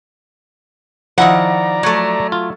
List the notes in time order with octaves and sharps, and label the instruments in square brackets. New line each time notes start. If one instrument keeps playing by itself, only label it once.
[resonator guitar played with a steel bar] D#3 F#5 [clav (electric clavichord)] F3 E4 [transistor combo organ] D5 A#5
[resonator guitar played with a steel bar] F#3 A3
[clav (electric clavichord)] F4